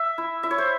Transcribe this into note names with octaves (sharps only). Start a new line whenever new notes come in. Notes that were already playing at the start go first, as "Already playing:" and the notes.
Already playing: E5
E4
E4 E5
C#5
C5